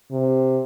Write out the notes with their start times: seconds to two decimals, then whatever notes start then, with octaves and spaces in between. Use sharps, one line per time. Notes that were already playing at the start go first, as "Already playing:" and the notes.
0.11 C3